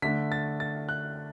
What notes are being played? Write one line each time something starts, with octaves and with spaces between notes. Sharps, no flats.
D3 A3 D4 B6
A6
A6
F#6